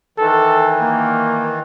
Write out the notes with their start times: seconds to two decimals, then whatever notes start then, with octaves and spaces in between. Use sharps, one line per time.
0.18 D#3 E3 A4
0.82 A#3